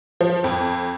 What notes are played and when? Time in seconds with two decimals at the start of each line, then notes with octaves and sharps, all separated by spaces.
0.21 F3
0.44 F2